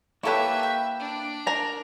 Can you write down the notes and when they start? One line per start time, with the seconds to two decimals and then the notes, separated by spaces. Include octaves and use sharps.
0.23 A#3 E4 G4 A4 B4 C#5 E5 C#6
0.63 G5
0.99 D4
1.47 A#4 A5 A#5